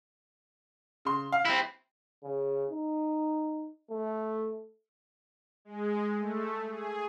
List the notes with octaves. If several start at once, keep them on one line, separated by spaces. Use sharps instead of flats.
C#3 C6
F5
C4 E4 F#7
C#3
D#4
A3
G#3
A3
G#4